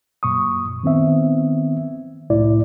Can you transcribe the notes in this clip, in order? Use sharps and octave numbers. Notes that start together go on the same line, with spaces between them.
F#2 A#2 C#6 D#6
D#3 B3 C4 E5
C2 A2 E4 D5